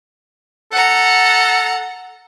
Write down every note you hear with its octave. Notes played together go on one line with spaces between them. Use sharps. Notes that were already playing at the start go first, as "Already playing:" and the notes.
A4 F#5 A#5